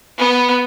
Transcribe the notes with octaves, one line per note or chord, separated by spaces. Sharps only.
B3